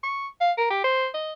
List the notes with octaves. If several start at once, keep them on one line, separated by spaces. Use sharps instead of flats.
C#6
F5
A#4
G4
C5
D#5